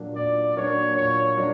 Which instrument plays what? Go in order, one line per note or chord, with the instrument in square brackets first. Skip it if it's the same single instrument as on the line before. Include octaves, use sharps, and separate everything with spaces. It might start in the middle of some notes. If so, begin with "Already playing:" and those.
Already playing: [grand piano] A#2 F#3 A#3 D4
[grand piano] A#2 [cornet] D5
[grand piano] F#3 A#3 D4 [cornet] C#5
[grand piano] A#2 [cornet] C#5
[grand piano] F#3 A#3 D4